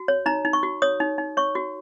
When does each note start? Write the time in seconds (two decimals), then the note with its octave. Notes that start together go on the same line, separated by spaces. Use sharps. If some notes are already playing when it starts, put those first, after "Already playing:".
Already playing: F#4
0.08 C#5
0.26 D#4 A#5
0.45 D#4
0.53 C#6
0.63 F#4
0.82 C#5 D#6
1.00 D#4
1.18 D#4
1.37 C#5 C#6
1.55 F#4